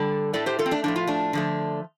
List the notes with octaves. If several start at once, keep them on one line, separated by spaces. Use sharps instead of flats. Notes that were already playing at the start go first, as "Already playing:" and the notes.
Already playing: D3 G3 A4 D5
A2 A3 A4 D5
G4 C5
F4 A4
C4
A3 D4
A2 F3 A3 D4
F4
A3 D4
D3 F3 A3